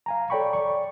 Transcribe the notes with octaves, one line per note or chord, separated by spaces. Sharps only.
F5 G#5 A#5
A4 C#5 D5 G5 B5 C#6
D5 C#6